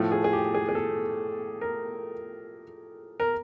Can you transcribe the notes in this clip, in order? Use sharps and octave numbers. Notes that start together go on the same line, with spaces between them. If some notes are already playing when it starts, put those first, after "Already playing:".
Already playing: A2 F3 A3
G#4
G#4
G4
G#4
G#4
A4
A#4
A#4